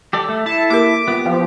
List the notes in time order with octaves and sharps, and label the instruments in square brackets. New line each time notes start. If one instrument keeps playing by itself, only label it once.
[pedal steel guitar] G4 A4 D5
A3
[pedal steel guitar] E4 A4 [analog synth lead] A5
[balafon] A#3 G4 A#4 [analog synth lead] D6
[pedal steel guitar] B3 G4 [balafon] F4
[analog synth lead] F3 [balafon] G5